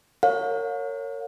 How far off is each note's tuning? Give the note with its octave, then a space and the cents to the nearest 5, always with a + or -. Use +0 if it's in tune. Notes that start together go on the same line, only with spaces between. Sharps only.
A#4 -30 C#5 +0 F5 +40